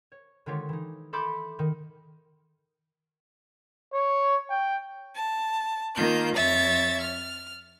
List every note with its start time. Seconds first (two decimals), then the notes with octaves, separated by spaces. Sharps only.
0.12 C#5
0.46 D3 D#3 G#3 F4 G4 C#5
0.69 E3 D#4
1.13 A4 E5 B5 C6 D6 G6
1.59 D#3
3.93 C#5
4.50 G5
5.15 A5
5.95 D#3 A#3 F4 G6
6.35 F2 F3 C#5 E5 A6
7.00 F6